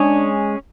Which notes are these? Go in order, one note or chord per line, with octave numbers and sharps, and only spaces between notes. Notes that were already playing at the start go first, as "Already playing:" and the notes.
Already playing: G#3 C#4 D4 G#4 C#5